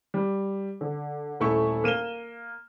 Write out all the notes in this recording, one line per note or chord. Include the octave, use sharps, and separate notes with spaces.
G3
D3
D#1 A3 E4 C#6
A#3 D#7 E7 G7